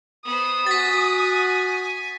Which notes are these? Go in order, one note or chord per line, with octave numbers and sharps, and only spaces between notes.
B3 C5 D#6
F#4 G#5 A6 B6